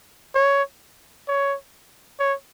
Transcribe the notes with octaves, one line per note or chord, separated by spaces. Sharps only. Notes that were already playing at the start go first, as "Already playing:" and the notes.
C#5
C#5
C#5